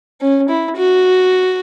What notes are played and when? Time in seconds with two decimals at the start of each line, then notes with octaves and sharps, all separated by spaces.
0.21 C#4
0.49 E4
0.77 F#4